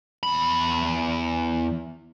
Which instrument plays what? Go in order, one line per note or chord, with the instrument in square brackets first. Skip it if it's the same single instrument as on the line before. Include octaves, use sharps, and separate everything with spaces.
[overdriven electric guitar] E2 B5